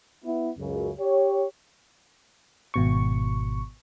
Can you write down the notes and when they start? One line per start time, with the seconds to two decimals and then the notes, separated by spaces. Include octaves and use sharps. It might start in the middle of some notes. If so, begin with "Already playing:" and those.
0.24 B3 E4
0.57 C#2 F#2 C#3
0.99 G4 C#5
2.74 G#1 B2 C#6